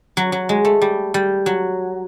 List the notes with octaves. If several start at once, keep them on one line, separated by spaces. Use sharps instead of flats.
F#3
F#3
G#3
A3
G3
G3
F#3